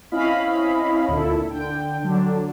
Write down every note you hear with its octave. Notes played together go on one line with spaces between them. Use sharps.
C4 C#4 E4 D#5 F5 B5
D2 A#2 E4 A4
D3 G5
D3 F#3 D4